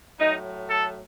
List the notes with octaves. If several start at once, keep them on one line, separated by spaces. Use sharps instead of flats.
A2 F#3 D#4
A4